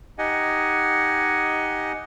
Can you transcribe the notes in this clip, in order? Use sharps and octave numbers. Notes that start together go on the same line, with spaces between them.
D#4 G4 D#5 F#5 G#5